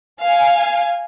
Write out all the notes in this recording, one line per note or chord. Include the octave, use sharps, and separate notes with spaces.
F5 G#5